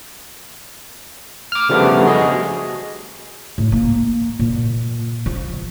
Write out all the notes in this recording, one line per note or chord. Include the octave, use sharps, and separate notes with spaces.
D6 F6
C#3 F3 G3 A3 B3 D4
F#4 G#4 D#5
A2
A#3
A#2
F3